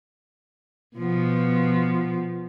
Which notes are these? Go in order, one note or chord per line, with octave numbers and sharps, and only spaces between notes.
B2 F3 B3